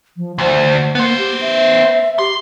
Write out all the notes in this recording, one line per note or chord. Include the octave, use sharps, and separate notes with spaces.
F3
D2 C5
A#3 B3 C5
G4
E5
G4 C6